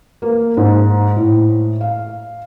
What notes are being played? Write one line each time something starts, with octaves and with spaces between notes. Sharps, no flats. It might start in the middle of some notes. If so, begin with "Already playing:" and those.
A#3
G#2
A2
F5